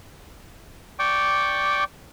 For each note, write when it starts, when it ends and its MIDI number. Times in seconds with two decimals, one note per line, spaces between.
0.99 1.84 74
0.99 1.84 79
0.99 1.84 85
0.99 1.84 86